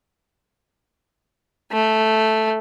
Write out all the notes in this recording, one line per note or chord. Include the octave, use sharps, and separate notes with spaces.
A3